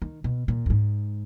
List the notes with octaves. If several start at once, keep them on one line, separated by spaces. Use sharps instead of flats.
D#3
B2
A#2
F#2
G#2